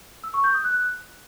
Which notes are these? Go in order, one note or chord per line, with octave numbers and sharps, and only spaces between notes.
E6
C#6
G6
D#6
F#6